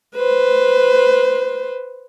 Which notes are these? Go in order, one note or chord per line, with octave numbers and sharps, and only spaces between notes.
B4 C5